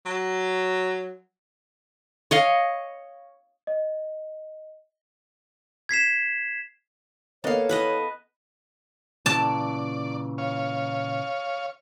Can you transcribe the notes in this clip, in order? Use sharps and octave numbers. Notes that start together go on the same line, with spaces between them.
F#3
C#5 D#5 F5
D#5
G#6 B6 C7 E7
A#3 B3 A4 C#5 D#5 F5
E3 B3 B4 D#5
A#2 C#3 E3 D5 A5
C#5 F5